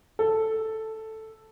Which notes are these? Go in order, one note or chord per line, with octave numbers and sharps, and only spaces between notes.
A4